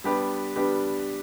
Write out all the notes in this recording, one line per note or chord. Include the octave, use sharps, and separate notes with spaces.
G3 B3 D4 G4 B4
G3 B3 D4 G4 B4